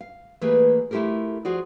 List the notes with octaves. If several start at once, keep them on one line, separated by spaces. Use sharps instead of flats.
F5
E3 A3 A#3 G4 G#4 B4
A3 E4 F4 G4 A4 A#4
F3 F4 F#4 G#4 D5